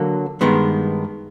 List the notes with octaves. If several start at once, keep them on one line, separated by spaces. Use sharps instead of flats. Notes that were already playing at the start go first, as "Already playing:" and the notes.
Already playing: D3 F#3 A#3
G2 D#3 G#3 B3